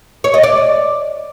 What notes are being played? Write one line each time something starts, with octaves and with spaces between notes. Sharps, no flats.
C#5
D#5
D5